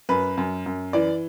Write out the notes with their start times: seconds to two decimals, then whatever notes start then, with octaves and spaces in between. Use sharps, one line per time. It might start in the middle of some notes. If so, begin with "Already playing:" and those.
0.09 F#2 B4
0.38 F#2
0.66 F#2
0.93 E3 D5